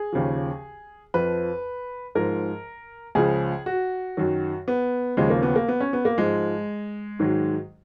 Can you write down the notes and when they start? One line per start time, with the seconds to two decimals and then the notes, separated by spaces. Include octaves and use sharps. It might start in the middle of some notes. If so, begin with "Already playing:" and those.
Already playing: G#4
0.12 D#2 C#3 F3
1.14 F2 F3 B4
2.15 G#2 F3 A#4
3.15 C#2 C#3 F3 G#4
3.66 F#4
4.17 F#2 D#3 F#3
4.68 B3
5.17 D#2 C#3 F3 G#3
5.30 A#3
5.43 B3
5.56 A#3
5.68 B3
5.80 C#4
5.93 B3
6.05 A#3
6.18 G#2 F3 G#3
7.19 G#2 D#3 F#3